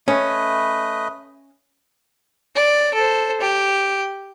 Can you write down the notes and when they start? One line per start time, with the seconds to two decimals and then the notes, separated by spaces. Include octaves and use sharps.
0.08 A3 C#4 B4 D#5
2.56 D5
2.94 A4 C5
3.41 G4